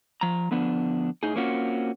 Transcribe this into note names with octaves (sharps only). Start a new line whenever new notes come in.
F3 A#5
D3 F3 B3 D4
A2 D#4 G#4
A#3 C4 C#4 F4 F#4